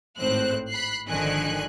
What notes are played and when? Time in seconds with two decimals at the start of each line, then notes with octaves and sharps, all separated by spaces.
0.19 G#1 A2 C4 C5 F#6
0.71 B5 F#6 C7
1.09 G#1 D3 D#3 F3 G#5 F#6